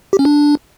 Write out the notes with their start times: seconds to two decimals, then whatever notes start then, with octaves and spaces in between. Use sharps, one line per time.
0.13 G4
0.19 C#4
0.25 D4